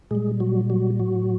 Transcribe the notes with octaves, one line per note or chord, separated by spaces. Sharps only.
A#2 G3 G#3 G#4
F#3 F#4
F#3 F#4
A2 F#3 F#4